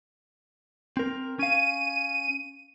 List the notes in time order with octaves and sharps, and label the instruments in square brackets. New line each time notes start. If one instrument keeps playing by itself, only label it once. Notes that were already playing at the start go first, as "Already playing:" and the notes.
[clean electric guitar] C4 A#4
[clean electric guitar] C#4 F5 [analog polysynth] D#7